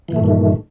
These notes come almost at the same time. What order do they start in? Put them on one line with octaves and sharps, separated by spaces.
E3 A#2 A3 G2 D#3